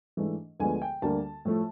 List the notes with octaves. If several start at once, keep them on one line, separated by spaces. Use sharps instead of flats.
G#2 E3 A3 D4
D2 D3 F3 G#3 B3 G#5
G5
D2 D3 G3 A#3 A5
A2 F3 A3